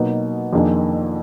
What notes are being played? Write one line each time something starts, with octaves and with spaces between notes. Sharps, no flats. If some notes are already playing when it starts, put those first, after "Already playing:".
Already playing: B2 F#3 A#3 D#4
F2 D#3 A#3 D4 G#4